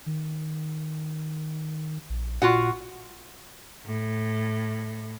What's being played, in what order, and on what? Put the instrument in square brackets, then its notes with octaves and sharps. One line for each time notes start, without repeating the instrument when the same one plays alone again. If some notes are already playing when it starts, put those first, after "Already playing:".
[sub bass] D#3
A#1
[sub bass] A#2 [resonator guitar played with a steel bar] F4 F#4 F#5
[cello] A2